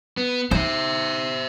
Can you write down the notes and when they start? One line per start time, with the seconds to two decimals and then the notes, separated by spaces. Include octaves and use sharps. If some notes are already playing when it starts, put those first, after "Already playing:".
0.17 B3
0.51 D#4 C5 E5